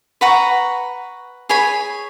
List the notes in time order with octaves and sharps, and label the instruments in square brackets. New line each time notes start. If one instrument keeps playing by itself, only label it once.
[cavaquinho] B4 F#5 A#5 C#6
G#4 C#5 G#5 B5